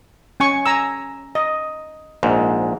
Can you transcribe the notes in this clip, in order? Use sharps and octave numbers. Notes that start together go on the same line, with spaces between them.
C#4 G#5 C#6
G#5 A#5 E6
D#5
A#1 G#2